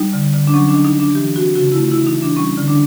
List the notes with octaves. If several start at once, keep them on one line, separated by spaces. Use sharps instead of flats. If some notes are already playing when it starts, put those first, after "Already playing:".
Already playing: G3 D#4
D3
D3
D4
F#3 C#4
D4
D#3
D#4
D#3 D4
E3 G4
C4 F#4
C#3 F#4
E4
A3 F4
E3 E4
D#4
E3
D4
G3 C#4
D3
D4